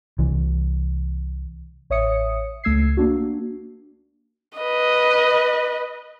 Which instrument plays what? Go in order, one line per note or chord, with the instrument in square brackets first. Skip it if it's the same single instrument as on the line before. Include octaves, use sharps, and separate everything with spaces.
[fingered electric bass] C2 E3
[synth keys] A1 C#5 E5 D#6 C#7
C#2 A3 E6 G#6 C7
A#3 D4 F#4
[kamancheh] B4 D#5